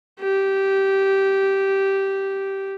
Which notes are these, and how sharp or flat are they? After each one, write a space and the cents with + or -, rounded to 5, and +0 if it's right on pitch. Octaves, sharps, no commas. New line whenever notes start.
G4 -10